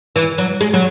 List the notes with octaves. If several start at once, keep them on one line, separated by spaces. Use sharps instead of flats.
E3
F#3
G#3
F#3